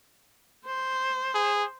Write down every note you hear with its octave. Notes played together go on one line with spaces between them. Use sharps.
C5
G#4